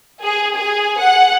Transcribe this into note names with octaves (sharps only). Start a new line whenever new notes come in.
G#4
G#4
F#5